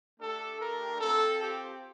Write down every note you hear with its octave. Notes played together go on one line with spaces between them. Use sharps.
A3 D4 G4 A4
A#4
C4 F4 A4
G4